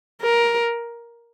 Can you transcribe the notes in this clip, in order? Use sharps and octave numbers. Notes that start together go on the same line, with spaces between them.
A#4